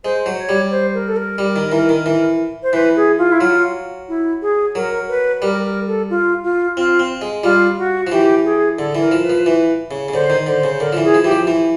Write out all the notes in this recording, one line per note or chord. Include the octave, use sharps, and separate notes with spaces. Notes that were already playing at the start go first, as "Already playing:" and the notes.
G#3 C5
F#3
C#5
G3
C5
A#4
A4
A#4
G3
D#3
E3
D#3
E3
C5
E3 B4
G#4
F4
E4
F#3 F4
E4
G#4
F#3 A#4
B4
G3 A#4
A#4
A4
F4
F4
C4 F4
C4
G#3
G3 F4
F#4
F3
E3 G4
G#4
D3 A4
E3
A#4
F3
B4
F3
E3 B4
C#3
C#3
D3 C5
D#3
D3 C5
C#3
D3 A#4
F3
E3
G#4
F3
E3 G4
F3
E3